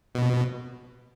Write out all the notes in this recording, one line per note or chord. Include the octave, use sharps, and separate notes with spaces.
B2